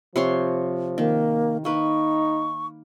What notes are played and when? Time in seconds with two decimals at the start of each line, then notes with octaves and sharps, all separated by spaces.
0.16 C3 F3 C#5 C6
0.98 D#3 A#3
1.65 A#3 D#4 B4 C#6